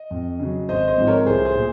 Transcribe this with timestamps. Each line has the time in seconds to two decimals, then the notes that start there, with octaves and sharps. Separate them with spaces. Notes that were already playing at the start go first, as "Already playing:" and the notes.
Already playing: D#5
0.11 F2
0.39 C#3 F#3
0.69 G#1 C5 D#5
0.88 C5 D#5
0.97 G#2 F3 G#3 C4
1.07 A#4 C#5
1.26 C2 G#4 C5
1.45 G#4 C5
1.55 A#2